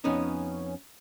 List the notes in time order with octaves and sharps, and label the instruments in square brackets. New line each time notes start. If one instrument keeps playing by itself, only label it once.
[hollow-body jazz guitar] F2 B3 D#4 [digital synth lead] C#4